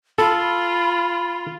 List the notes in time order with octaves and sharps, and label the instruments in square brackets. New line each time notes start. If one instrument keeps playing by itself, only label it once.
[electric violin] F4 [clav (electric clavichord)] A4 [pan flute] B5